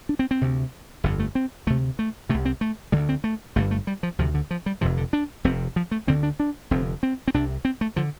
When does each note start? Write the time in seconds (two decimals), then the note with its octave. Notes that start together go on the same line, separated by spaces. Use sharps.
0.09 D4
0.19 C4
0.31 C4
0.41 D2 C3
1.04 G1 F2 D3
1.19 A3
1.35 C4
1.67 D2 C3 A3
1.99 A3
2.29 C3 A3
2.34 C2
2.45 C4
2.61 A3
2.92 D2 D3 G3
3.09 C4
3.24 A3
3.56 G1 G2 D3 A3
3.71 A3
3.87 G3
4.03 F3
4.19 D2 C3 F3
4.34 D3
4.51 F3
4.66 G3
4.81 F1 F2 C3 F3
4.97 D3
5.13 D4
5.44 F1 F2 C3 C4
5.76 F3
5.91 A3
6.07 D2 D3 C4
6.23 D4
6.40 D4
6.71 F1 F2 D3 C4
7.03 C4
7.28 C4
7.34 C2 C3 D4
7.65 C4
7.81 A3
7.96 D3 F3